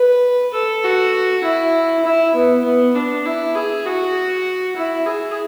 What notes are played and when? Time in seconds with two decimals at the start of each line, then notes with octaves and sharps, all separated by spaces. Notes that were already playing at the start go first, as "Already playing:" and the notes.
Already playing: B4
0.54 A4
0.84 F#4
1.44 E4
2.05 E4
2.35 B3
2.65 B3
2.95 D4
3.26 E4
3.55 G#4
3.85 F#4
4.76 E4
5.06 G#4